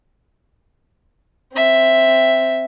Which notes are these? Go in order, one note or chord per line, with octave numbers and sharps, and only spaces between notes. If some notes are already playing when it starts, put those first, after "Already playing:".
C4 E5